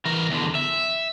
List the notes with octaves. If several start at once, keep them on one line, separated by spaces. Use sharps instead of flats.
E3 A#4
E2 D3
E5